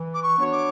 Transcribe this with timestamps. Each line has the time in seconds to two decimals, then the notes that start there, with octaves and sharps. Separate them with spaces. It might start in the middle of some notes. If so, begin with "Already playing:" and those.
Already playing: E3
0.14 D6
0.23 C#6
0.37 B3 D4 F#4 C#5
0.52 D6